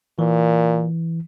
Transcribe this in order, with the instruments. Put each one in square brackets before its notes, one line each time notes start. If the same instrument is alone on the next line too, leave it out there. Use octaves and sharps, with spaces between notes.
[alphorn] A#2 [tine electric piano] E3